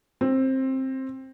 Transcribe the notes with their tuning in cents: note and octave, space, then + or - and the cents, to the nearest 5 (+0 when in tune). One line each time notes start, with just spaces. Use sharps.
C4 +15